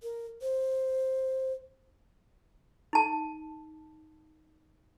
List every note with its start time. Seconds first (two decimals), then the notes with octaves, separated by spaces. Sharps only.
0.03 A#4
0.42 C5
2.93 D#4 A5